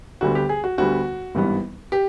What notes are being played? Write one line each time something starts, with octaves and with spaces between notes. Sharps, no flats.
D2 D3 G3 B3 F#4
G4
G#4
F#4
D2 D3 G3 B3 F#4
G#1 G2 E3 G3 B3
G4